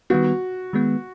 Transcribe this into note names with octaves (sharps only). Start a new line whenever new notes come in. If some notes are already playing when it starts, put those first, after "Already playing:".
D#3 G3 B3 F#4
D#3 G#3 B3